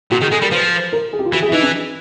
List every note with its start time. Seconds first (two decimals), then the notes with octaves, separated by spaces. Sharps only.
0.11 A#2 F#4
0.21 D#3 G#4
0.31 G#3 A4
0.41 G3 A#4
0.51 F3 B4
0.92 A#4
1.13 G#4
1.19 G4
1.25 F4
1.32 E3 F#4
1.42 G#4
1.48 E4
1.52 E3 D#4
1.62 D4